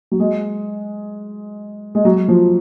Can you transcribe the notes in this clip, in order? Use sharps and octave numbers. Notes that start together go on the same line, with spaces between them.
F#3
G#3
G#3
F#3
F3